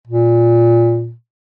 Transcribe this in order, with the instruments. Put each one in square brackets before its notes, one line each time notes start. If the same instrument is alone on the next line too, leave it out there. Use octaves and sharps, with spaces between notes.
[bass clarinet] A#2